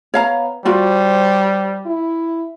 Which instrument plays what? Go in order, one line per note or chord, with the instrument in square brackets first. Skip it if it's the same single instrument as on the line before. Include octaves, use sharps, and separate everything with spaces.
[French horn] B3 [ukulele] C#5 F5 A#5
[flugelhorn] G3 [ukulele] F4 F#4 D5 [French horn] C5
[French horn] E4